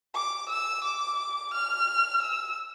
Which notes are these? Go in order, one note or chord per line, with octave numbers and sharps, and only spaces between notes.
D6
E6
D6
F6
E6